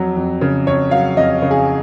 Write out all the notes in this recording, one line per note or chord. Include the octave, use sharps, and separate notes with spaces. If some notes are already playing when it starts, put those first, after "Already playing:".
Already playing: F2 F#3
F2
C#3
F2 C#5
F#3 F5
F2 D#5
C#3
G#4